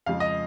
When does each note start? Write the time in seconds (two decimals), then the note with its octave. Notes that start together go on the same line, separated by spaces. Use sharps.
0.06 F2 C#3 F3 G#3 F5
0.20 D#5